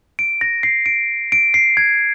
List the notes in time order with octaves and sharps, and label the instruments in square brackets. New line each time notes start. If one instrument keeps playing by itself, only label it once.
[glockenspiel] D7
A#6
C7
D7
D7
C7
G#6